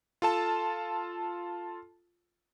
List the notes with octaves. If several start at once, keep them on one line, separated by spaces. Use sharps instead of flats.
F4 A4 A5